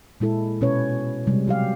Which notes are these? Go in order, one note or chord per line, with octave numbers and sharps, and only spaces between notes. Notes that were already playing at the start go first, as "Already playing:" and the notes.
A#2 G#3 E4 A4
B2 C#4 B4 C#5
C3 G3 G#3
F#3 G4 F5